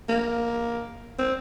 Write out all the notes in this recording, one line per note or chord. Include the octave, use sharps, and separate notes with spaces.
A#3
C4